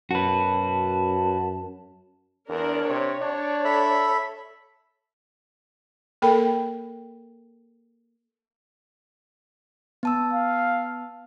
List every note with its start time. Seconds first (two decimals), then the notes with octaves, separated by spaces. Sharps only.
0.11 F#2 F#4 B4 A5
2.49 E2 D4 A#4
2.89 C3 C#5
3.21 D4
3.65 A4 E5 B5
6.22 A#3 A4 A#4 G5 B5
10.03 B3 A5 E6
10.33 F5